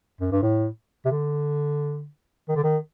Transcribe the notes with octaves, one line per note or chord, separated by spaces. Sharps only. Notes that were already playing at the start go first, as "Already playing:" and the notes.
F#2
G2
A2
C3
D3
D#3
D3
D#3